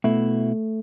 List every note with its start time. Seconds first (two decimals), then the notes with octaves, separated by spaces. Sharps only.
0.04 B2 A3 E4